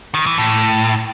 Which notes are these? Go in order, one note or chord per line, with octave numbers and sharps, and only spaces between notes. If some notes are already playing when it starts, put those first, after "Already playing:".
D#3
E3
A2